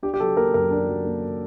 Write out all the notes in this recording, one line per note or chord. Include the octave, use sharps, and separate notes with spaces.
D4 G4
G4
F#3 A4
A#3 A#4
F#2 A#4
D4
F#3
A#3